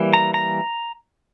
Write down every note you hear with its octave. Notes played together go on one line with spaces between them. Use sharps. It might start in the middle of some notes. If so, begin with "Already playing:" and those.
Already playing: E3 G3 A#3
A#5
A#5